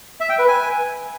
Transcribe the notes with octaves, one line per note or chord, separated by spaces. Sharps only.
E5
G5
B4
G#5